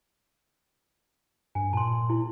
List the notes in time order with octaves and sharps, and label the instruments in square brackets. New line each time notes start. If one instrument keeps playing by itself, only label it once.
[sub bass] G2 [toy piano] G#5
[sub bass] A#2 [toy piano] A5 C6
[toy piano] E4